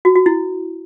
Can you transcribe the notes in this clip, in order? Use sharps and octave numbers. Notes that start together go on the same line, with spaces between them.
F#4
F#4
E4